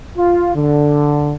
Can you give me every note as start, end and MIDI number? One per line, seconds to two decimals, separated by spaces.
0.17 0.53 65
0.54 1.34 50